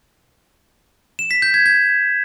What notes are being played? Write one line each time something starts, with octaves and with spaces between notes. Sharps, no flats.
E7
B6
G6
G#6
G#6